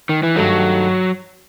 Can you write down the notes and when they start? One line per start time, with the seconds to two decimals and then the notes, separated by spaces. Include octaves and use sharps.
0.09 D#3
0.23 E3
0.35 G2 D#3 F#3 A3 D#4